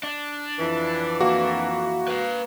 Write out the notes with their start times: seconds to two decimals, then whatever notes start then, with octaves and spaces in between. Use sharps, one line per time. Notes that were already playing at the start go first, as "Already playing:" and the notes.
0.03 D4
0.59 F2 E3
1.21 A#3 F#4
2.08 B4 F5